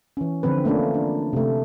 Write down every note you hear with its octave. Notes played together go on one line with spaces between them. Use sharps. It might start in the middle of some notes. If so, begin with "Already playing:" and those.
E3 C#4
D3 F3 C4 B4
A3 A#3 C#4 D4 F4
D4
C3 A3